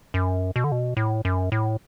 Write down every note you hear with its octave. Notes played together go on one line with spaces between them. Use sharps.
F#2
B2
D3
B2
A2
F#2
A2